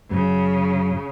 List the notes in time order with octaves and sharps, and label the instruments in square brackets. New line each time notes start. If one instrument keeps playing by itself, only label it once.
[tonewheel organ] F#2 F#3 [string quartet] C#3